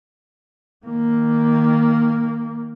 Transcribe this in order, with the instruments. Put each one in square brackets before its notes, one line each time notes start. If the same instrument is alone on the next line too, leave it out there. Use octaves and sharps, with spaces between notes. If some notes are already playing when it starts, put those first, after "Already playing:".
[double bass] D#3 A#3